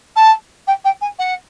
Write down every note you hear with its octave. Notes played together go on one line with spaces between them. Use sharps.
A5
G5
G5
G#5
F#5